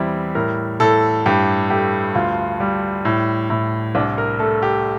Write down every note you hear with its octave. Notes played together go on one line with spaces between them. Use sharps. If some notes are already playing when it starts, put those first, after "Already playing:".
Already playing: E2 G3 C4 E4
A2 A#4
A2 A4
G2 G4
A3 G4
D2 F4
G3
A2
A2
C2 D4
A#4
A3 A4
G4